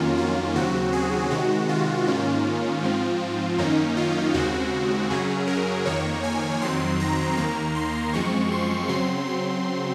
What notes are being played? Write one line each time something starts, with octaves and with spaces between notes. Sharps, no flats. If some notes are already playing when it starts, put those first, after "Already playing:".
Already playing: F2 D#3 F#3 A#3 C#4 F4
F4
D#2 C#3 F#3 C4 F#4
G#4
C3 D#3 G#3 F#4
F4
G#2 D#3 A#3 C#4
G#2 F3 C4
F#2 D#3 A#3 C#4 D#4
F4
D#2 C#3 G#3 C4 F#4
F#2 C#3 F#3 C#4 G#4
A#4
F2 D#3 A#3 C#5
G#5
F2 D#3 F#3 C4 C6
A#5
D#2 D#3 A#3 A#5
C6
F#2 F3 G#3 C4 C#6
C6
C#3 F#3 C4 C6
C6